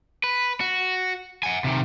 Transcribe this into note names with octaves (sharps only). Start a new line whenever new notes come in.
B4
F#4
F#5 G#5
C3 D#3